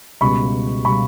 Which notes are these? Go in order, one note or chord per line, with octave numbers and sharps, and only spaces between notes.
C#2 B2 G3 B5 C#6
B2 G3 B5 C#6